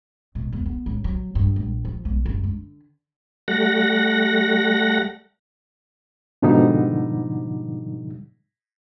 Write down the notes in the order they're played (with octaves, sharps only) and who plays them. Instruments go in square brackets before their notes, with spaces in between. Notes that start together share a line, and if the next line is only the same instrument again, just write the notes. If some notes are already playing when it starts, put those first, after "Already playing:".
[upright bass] B2
E2
B3
A1
F#3
G2
A#1
F3
B1
F#1
D3
[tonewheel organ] G3 A3 F#5 A#6
[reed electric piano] G#2 B2 D3 F3 G3 D#4